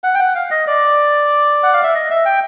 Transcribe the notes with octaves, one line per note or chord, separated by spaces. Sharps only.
F#5
G5
F#5
F5
D#5
D5
F#5
F5
E5
D#5
E5
G5